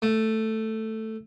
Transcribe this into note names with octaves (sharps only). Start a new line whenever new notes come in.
A3